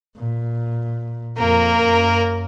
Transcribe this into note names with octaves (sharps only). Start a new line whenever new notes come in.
A#2
F2 A#3 A#4
F#2